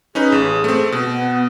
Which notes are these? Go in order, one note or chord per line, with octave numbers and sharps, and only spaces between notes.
C#4 D#4 G#4 B4
A1
A3 C4
B2
B3